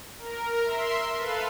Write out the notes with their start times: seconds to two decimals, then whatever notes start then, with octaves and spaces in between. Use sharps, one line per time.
0.18 A#4
0.64 E5 C6
1.17 A4 B4 F5